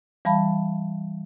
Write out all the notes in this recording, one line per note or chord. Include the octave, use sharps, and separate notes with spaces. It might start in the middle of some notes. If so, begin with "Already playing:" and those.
E3 G3 F5 A5 B5